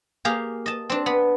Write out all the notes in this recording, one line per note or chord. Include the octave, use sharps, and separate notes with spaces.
A#3 G4 G#4 F5
D#5 A5
C4 D4
B3